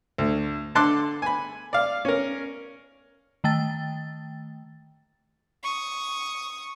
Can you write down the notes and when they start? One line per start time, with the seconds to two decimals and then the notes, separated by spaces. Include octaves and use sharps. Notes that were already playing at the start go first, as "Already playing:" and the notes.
0.18 D2
0.75 D3 A4 A5 C6 D6 F#6
1.22 G#5 B5
1.73 D5 F5
2.05 C#4 A#4
3.44 D#3 A3 G5 A6
5.63 C#6 D#6